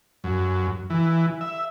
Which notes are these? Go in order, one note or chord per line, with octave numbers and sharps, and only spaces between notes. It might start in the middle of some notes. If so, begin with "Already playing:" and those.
F#2
E3
E5